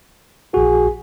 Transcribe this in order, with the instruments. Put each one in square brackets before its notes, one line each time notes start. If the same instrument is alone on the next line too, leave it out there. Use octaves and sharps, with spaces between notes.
[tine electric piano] A#1 F#4 [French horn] G#4